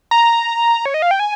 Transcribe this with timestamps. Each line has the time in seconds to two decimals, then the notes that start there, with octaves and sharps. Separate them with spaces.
0.11 A#5
0.86 C#5
0.94 D#5
1.02 F5
1.11 G5
1.20 G#5